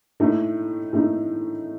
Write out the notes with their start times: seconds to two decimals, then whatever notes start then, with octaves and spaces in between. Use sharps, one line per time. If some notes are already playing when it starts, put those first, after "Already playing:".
0.20 A2 A3 D#4
0.93 A2 A3 D#4